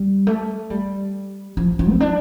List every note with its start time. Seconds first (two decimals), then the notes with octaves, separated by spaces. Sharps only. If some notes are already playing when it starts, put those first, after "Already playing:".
Already playing: G3
0.27 A3
0.70 G3
1.57 F3
1.79 F3
1.90 C4
2.00 D4